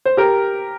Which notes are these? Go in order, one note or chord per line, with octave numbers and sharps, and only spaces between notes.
C5
G4 A#4